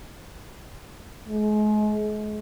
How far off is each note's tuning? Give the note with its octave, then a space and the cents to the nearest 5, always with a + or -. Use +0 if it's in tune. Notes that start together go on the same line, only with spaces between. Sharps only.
G#3 +35